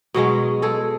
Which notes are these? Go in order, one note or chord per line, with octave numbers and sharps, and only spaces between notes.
B2 F#3 G#3 C#4
G#3 G#4 A4